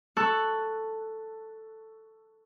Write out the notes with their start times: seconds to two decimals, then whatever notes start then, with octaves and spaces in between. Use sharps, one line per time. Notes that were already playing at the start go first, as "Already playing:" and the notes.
0.17 A4 C#6 E6 F#6